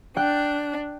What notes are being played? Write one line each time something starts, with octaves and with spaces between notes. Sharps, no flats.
D4 G5 F#6